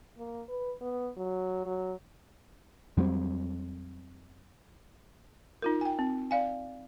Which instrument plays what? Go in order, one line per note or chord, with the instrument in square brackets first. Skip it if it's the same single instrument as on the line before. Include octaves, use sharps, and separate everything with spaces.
[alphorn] A#3
B4
B3
F#3
F#3
[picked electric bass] F2 F#3 G3 C4
[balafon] D#4 F4 A#4
G5 G#5
C4
D5 F5 G#5